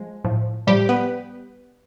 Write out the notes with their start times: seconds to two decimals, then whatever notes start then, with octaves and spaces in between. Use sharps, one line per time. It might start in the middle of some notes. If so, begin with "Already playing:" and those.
Already playing: F3 G#3
0.24 A2 F3
0.67 A2 F3 G3 G4
0.89 B3 B4